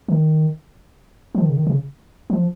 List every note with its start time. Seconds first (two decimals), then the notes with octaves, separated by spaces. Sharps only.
0.08 D#3
1.35 F3
1.42 D#3
1.49 C#3
1.57 D#3
1.67 C#3
2.30 F3